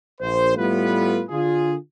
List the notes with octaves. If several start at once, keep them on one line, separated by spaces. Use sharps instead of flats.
A#1 C5
A2 G3 A3 B3 F4 B4
D3 F4 G#4